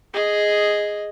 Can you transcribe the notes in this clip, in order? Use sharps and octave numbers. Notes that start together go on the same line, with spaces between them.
G#4 D#5